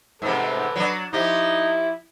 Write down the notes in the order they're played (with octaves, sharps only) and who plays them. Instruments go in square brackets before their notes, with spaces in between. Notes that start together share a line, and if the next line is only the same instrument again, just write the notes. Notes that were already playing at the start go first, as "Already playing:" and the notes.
[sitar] G#2 C3 [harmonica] A4 B4
[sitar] F#3 D4
[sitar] F3 G4 [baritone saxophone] D#4 [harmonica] E4